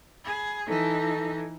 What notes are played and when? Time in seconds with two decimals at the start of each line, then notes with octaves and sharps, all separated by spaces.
0.25 G#4 B5
0.67 E3 D#4 A4